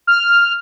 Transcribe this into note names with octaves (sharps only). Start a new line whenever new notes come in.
F6